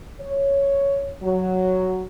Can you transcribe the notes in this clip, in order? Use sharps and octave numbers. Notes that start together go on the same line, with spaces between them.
C#5
F#3